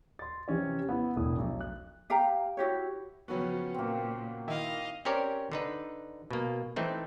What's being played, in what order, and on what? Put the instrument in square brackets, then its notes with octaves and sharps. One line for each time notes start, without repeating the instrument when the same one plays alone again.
[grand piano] C6 A6
C3 E3 C#4 C#5
B3 E4
E1 A2 E4 D#6
B1
F#6
[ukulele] G4 F5 G5 A#5
E4 F#4 G4 C#5
[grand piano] C#3 F#3 B3 [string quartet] F3 C#4 [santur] F#4 B4 G5
[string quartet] A#2 [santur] A#3 C4
[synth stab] D#3 E4 [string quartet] D#5 F5
[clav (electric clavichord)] C4 C#4 G4 A#4 C#5 D5
D3 D#4 B4
B2 A#3
E3 A3 C4 D#4